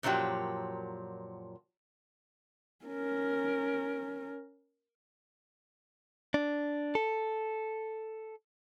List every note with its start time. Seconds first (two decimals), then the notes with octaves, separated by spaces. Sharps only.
0.03 F#2 A#2 F3 F#3 G4
2.85 C#4 A#4
6.34 D4
6.95 A4